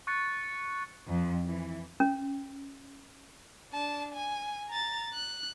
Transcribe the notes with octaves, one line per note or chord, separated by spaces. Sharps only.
C#6 F#6 A6 C#7
F2
E3
C#4
D4 A5
G#5
A#5 A6
F#6